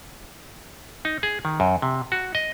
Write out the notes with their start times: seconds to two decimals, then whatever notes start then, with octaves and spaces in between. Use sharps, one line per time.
1.05 D#4
1.23 G#4
1.45 D#3
1.60 F#2
1.82 C3
2.12 F#4
2.35 D#5